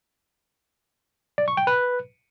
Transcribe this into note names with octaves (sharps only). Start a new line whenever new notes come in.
D5
C#6
G5
B4